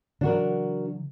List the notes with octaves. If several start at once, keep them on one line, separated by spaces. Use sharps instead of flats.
C#3 E3 F#3 D4 F#4 A#4